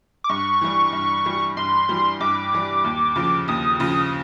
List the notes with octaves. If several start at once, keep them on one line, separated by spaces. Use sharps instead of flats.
D6
G2 C#6
E3 G3
G2
E3 G3
G2 C6
E3 G3
G2 D6
E3 G3
D#2
C#3 F3
D#2 D#6
C#3 F3 D#6